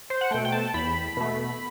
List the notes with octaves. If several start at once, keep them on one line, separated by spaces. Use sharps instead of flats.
C5
F#5
B2 A3 G5
G5
A5
E2 B5
B2 A3